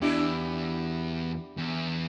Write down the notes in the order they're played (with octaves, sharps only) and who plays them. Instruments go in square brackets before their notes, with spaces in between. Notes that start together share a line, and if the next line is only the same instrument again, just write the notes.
[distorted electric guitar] E2 [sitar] D4 E4 G4
[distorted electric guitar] E2